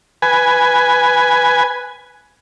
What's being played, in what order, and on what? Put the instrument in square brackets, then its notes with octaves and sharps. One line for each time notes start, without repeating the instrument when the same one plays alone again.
[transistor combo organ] B4 G#5